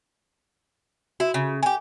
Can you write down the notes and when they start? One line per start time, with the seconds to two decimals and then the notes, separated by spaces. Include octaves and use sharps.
1.20 E4 F#4
1.34 C#3
1.63 G4 G#4 G#5